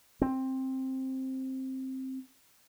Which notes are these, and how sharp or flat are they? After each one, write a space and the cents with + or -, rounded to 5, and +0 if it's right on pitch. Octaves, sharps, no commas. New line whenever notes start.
C4 +10